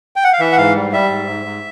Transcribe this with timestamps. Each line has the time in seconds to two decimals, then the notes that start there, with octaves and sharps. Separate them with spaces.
0.16 G5
0.24 F#5
0.33 F5
0.40 E3 E5
0.52 F#5
0.58 G#2 F5
0.75 G3
0.92 G3 E5
1.10 G#2
1.27 G#2
1.45 G#2